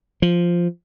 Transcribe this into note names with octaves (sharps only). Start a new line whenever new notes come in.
F3